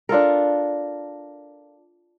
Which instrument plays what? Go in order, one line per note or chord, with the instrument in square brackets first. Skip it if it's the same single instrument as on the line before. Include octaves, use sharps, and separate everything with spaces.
[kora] D4 F4 A4 A#4